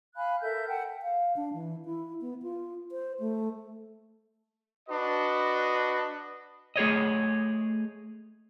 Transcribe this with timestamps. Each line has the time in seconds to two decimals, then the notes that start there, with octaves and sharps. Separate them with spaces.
0.14 F5 G#5 B5 F#6
0.41 A4 A#4 E5 G6
0.68 F#5 G5 A5
1.02 F5
1.36 D4
1.54 E3
1.85 E4
2.21 B3
2.42 F4
2.92 C5
3.20 A3
4.89 D4 F#4 B4 D#5
6.76 A3 G#4 C#5 D#5